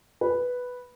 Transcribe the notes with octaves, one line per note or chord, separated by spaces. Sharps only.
B4